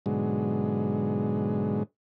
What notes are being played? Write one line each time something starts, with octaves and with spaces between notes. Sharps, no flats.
G#2 B2 D3 F#3 G#3